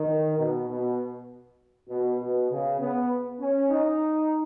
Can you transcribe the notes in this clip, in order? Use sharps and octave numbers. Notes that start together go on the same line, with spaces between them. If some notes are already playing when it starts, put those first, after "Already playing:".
Already playing: D#3
B2
B2
B2
B2
C#3
B3
C#4
D#4